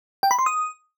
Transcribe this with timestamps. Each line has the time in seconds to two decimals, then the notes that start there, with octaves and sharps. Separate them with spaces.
0.23 G5
0.31 B5
0.39 C6
0.46 D#6